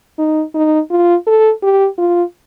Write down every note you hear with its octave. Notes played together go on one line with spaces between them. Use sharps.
D#4
D#4
F4
A4
G4
F4